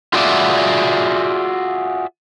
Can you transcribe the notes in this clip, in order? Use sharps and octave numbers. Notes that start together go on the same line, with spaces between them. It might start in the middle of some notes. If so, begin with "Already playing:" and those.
F4 F#4 G#4 D5 E5 F#5